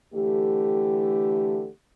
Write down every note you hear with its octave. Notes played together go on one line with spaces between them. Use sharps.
D3 E3 A3 G4